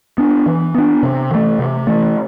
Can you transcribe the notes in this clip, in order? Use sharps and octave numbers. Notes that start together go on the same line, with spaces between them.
B3 D4
E3
B3 D4
C3
E3 A3
C3
E3 A3